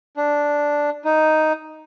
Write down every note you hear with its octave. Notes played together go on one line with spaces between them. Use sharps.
D4
D#4